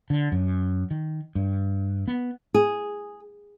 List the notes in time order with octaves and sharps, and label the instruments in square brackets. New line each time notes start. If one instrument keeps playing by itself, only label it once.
[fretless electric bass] D3
F#2
D#3
G2
B3
[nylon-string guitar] G#4